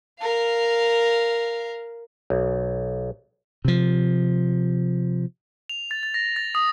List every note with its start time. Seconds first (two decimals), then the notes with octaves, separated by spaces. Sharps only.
0.20 A#4 F5
2.30 B1
3.65 C3 F3
5.69 F7
5.91 A6
6.03 A6
6.14 A#6
6.36 A6
6.55 D#6